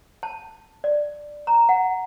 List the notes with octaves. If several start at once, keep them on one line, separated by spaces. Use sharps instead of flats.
A5
D5
A#5
F#5